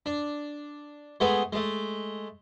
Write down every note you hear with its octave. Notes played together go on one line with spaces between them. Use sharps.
D4
G#3 A3 B3 G#4
G#3 A3